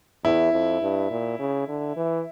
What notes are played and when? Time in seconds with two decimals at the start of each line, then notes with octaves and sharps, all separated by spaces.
0.24 E2 E4
0.53 F2
0.81 G2
1.11 A#2
1.39 C#3
1.68 D3
1.96 E3